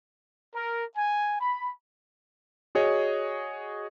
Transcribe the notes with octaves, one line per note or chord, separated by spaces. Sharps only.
A#4
G#5
B5
F#4 G#4 C#5 D#5